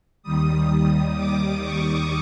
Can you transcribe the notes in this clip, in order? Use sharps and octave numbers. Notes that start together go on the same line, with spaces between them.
D#2 D#3 G3 D#6
D#6
D6
C#6